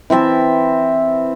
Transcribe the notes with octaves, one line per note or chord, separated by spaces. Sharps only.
E3 C4 E5 A5